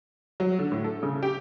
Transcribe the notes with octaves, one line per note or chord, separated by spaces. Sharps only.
F#3
D3
A2
A4
C#3
G4